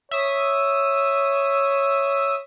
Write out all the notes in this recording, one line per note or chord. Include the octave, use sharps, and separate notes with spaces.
C#5 E5 D#6